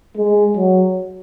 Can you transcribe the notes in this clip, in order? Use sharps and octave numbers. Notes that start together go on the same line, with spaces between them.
G#3
F#3